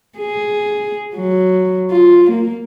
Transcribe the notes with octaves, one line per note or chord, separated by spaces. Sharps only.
G#4
F#3
F4
A#3